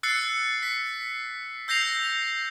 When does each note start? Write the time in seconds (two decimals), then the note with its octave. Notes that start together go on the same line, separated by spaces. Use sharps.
0.03 E6 F#6 A6 C7 C#7
0.63 B6
1.68 E6 G6 A#6 C7 F7